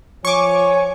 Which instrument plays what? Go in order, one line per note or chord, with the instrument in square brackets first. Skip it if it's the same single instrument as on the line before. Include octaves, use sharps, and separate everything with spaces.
[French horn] F3 [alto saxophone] C#5 [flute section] G#5 [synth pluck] C#6 D6